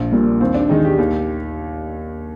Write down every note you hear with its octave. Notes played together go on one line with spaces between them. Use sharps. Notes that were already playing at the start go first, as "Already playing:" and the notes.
Already playing: A#1
A#2 G3 A#3
D#2 C4
D4
D#3 G#3 D#4
G4
D#2